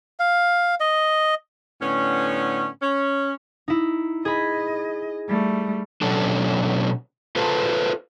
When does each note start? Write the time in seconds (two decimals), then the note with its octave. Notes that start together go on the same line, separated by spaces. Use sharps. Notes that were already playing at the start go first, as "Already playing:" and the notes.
0.20 F5
0.80 D#5
1.81 A2 D3 B3 C#4
2.82 C#4
3.68 D#4 E4
4.25 G#4 D#5 B5
5.28 G3 A3
6.02 B2 F#3 C#4 D4 A4
7.36 F4 A4 B4 C5 F5 A5